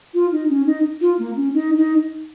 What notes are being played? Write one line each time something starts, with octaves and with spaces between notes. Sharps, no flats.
F4
D#4
C#4
D#4
F4
A#3
C#4
D#4
D#4